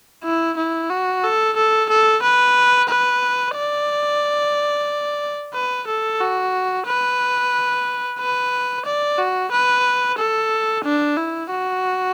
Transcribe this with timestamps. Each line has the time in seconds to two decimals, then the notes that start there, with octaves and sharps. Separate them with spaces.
0.24 E4
0.57 E4
0.90 F#4
1.23 A4
1.56 A4
1.89 A4
2.23 B4
2.89 B4
3.55 D5
5.54 B4
5.87 A4
6.20 F#4
6.86 B4
8.19 B4
8.86 D5
9.18 F#4
9.52 B4
10.18 A4
10.84 D4
11.17 E4
11.51 F#4